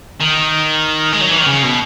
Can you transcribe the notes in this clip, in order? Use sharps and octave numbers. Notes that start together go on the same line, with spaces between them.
D#3
G#3
F#3
E3
D#3
C#3
B2